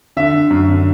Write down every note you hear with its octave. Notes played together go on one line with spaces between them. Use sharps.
D3 E5
D3
F#2
D3